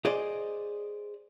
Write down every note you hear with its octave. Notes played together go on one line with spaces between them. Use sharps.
G#4 C5 D5 D#5